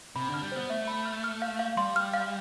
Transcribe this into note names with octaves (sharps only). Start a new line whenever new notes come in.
C3 B5
D3
F6
G3
B3 C5
A3 E5
B5
F6
F6
F5
F5
G3 C6
F6
F5